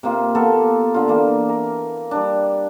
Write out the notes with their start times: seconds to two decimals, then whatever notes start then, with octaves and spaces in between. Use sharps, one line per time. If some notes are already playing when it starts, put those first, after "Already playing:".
0.03 C3 A#3 F4
0.35 A#3 B3 A4
0.94 D3 F4
1.08 E3 A#3
1.49 A#4
2.11 G3 D4